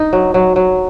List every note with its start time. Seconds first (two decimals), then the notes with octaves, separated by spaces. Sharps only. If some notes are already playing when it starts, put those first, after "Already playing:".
Already playing: D#4
0.13 F#3
0.34 F#3
0.56 F#3